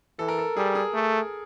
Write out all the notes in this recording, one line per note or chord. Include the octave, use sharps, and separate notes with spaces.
E3 A4
A#4
A4
G3 G#4
G#4
A3